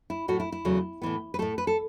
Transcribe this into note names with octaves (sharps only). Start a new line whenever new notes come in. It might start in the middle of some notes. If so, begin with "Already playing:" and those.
E4
A2 F#3 A3 F#4
E4
E4
E2 C#3 F#3 A3
A2 E3 B3
B4
A2 A3 A4
B4
A4